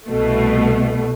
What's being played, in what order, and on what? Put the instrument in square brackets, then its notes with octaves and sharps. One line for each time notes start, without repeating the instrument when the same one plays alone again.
[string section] C2 B2 A3